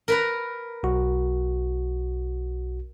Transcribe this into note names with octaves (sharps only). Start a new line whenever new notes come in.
A#4 B4 A#5
B1 F#4